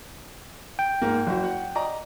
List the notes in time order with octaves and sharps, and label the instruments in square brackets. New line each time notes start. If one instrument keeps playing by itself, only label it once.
[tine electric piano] G5
[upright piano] G#2 A#3
F#1 F#4
F#5
D5 D#5 A#5